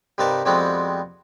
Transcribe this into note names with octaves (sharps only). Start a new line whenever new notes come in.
G2 C3 D#4 A#4 B4 A5
F2 G3 G#3 B3 C4 F#4